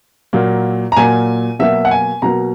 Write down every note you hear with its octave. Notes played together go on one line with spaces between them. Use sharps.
A#2 F#3 A#3
A#5
A#2 F#3 A#3 G#5
B2 F#3 A#3 E5
F#5
G#5
B2 F#3 A#3 A#5